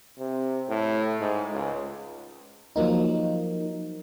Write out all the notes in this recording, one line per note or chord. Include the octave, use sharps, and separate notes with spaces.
C3
A2
G#2
C#2
F3 F#3 A#3 D#4